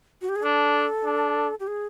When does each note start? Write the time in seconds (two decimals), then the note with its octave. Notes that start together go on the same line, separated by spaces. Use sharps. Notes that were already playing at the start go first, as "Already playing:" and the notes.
0.21 F#4
0.29 G4
0.36 G#4
0.43 D4 A4
1.05 D4
1.60 G4
1.67 G#4